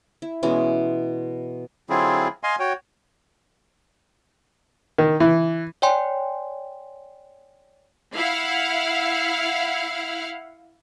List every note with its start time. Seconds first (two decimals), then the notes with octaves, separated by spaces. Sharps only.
0.22 E4
0.43 B2 E3 G#3 C#4
1.90 D3 F#3 C4 E4 F4 G#4
2.43 D#5 F5 G#5 C6
2.59 F#4 C#5 G5
4.98 D#3
5.20 E3
5.82 C#5 D5 G5 G#5 C6
8.14 E4 F5 F#5